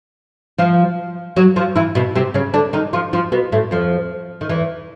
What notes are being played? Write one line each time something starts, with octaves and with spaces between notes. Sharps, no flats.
F3 F4
F#3 F#4
F3 F4
E3 E4
B2 B3
C3 C4
C#3 C#4
D3 D4
D#3 D#4
F3 F4
F3 F4
B2 B3
A2 A3
F2 F3
D#3
E2 E3